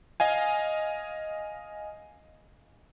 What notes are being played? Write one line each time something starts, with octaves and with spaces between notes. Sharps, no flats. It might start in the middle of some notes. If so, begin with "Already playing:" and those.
D#5 F5 G#5